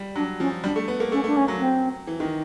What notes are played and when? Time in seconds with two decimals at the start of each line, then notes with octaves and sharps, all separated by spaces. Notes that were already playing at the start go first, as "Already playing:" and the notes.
Already playing: G3
0.15 F#3 D4
0.40 F3 C#4
0.64 G3 D4
0.76 A3
0.88 B3
1.00 A#3
1.12 A3 C#4
1.24 A3
1.26 D4
1.36 C#4
1.48 F#3
1.59 C4
2.07 E3
2.20 D#3